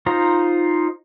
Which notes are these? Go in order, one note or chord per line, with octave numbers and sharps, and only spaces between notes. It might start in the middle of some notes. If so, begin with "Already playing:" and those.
D#4 F4 C5 A#5